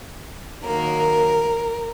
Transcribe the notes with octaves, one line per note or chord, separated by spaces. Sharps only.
D#3 F#3 A#3 A#4